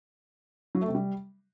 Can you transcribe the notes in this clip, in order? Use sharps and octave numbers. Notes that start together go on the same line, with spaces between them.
F#3
A3
C3
G3